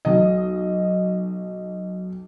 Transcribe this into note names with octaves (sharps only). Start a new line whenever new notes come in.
B1 D#5